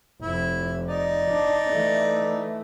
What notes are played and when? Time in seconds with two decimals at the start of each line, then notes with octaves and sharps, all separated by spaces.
0.22 F1 F2 E4
0.88 D#4 D5
1.29 D4
1.70 E3 A3